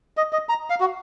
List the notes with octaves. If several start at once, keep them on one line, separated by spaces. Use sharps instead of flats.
D#5
D#5
A#5
F5
F#4